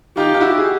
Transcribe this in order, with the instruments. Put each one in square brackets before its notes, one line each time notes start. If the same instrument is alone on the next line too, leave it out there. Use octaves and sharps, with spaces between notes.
[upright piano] D#4 F4 [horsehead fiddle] G4
[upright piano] F4
E4 F#4
G#4